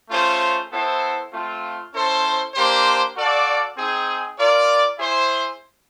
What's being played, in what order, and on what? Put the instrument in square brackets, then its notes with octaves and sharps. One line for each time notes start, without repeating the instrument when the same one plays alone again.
[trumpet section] A3 C#4 F4 G#4 C5
B3 E4 A4 C5
A3 C4 F4
C#4 E4 A4 C5
A#3 D4 G4 C5
F#4 A4 D5 F5
C4 D#4 G#4
F4 A#4 D5
E4 G#4 C5